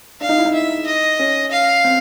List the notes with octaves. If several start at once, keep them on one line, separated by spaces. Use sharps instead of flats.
D4 F5
D#4
E4
D#4
E5
D#5
C#4
F5
C4